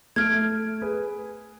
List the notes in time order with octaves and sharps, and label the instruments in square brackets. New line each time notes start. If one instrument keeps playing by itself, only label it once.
[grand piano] A3 D7 [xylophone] F6 G#6
[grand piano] G#4 B4